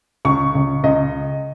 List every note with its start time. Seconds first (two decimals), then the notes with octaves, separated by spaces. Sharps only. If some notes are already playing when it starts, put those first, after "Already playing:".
0.25 C#2 C#6
0.55 C#2
0.84 C#2 D#5